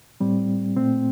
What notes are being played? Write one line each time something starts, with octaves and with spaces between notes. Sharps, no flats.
A2 G3 C4
A#2 A3 C4